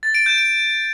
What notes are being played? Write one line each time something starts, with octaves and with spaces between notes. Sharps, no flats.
A6
D7
G6
D7